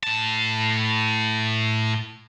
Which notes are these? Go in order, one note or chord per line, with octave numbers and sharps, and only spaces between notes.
A2 A5